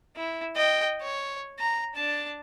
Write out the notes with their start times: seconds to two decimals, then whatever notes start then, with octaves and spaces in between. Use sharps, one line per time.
0.16 E4
0.56 D#5 G5
1.01 C#5
1.59 A#5
1.95 D4 A5